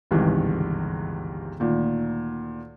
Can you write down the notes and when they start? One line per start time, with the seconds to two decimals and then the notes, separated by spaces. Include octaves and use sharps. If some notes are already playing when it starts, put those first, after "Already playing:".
0.11 G1 C#2 G#2 C3 D#3 E3
1.60 D2 A#2 D#3